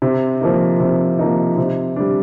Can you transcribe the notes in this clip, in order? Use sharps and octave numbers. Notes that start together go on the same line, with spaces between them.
C3
F3 A#3 D#4
C3
F3 A#3 D#4
C3
G3 D4